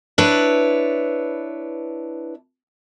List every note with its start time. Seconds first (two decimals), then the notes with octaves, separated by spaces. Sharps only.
0.18 D4 E4 B4 C#5